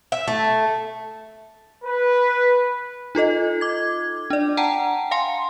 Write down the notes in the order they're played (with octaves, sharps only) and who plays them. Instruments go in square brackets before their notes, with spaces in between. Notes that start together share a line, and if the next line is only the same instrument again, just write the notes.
[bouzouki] E5
A3
[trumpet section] B4
[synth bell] D#4 F4 A4 D#5
D6 G#6
D4 D5
F#5 G5 A5 A#5
F5 G5 G#5 C6